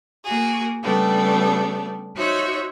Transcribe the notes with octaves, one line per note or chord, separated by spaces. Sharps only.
A#3 F#4 G#4
C#3 G3 A3 B3 D4
D#4 F#4 C5 C#5 E5